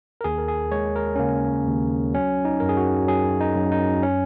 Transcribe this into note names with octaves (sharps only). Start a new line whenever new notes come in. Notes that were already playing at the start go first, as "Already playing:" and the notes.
A#4
D#2 G#4
A#4
G#4
G#3 C#5
A#4
C#4
C#3 A#3
D#2
F#3 C#4
D#4
F#2 A#4
G#4
F#4
F#3 G#4
D#4
F#2
D#4
C#4